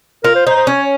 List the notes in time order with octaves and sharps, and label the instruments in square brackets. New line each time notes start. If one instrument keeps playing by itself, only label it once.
[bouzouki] F4 [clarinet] A#4
[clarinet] C5
[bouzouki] D#4 [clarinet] C5
[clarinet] C5
[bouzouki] C#4 [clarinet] C#5